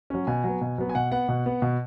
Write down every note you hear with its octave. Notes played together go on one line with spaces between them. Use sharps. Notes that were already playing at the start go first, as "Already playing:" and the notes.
F#3 C#4
B2 G#5
F#3 B3
B2
F#3 B3
G#5
B2 F#5
B3 F#5
B2
B3
B2